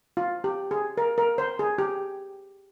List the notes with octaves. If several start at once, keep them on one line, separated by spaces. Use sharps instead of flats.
F4
G4
G#4
A#4
A#4
C5
G#4
G4